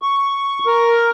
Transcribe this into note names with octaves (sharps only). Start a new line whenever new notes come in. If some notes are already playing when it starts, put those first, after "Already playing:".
C#6
A#4